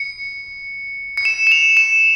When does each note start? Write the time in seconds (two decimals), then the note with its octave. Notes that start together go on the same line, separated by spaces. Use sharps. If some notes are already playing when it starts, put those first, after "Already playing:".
Already playing: C#7
1.17 C#7
1.25 E7
1.47 E7
1.52 F7
1.77 E7